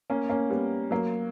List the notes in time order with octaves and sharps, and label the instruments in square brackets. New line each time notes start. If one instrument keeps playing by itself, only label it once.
[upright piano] A#3 C#4
A#3 C#4
G3 B3
F#3 A#3